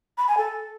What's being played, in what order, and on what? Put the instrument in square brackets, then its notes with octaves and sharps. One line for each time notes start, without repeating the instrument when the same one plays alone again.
[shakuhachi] B5
G#5
A4